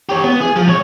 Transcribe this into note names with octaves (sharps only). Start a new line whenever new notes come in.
G4 C#5
B3
G#4
F3
B1 C#5